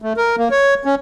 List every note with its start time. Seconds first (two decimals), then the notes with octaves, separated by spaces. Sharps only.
0.02 A3
0.17 A#4
0.38 A#3
0.51 C#5
0.85 C#4